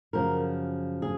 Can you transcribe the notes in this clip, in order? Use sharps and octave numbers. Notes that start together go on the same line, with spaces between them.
F#2 C#3 F3 A#4
G#4